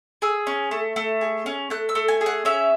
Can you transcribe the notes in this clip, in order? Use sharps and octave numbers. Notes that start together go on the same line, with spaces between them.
G#4 E6
C#4
A3
A3
G#4
C#4
A3 F#6
E6
A3
G#5
G#4
F#5
C#4 E5